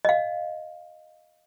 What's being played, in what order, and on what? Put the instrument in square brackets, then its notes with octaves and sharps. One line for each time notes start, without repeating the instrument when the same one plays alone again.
[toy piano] D#5 F5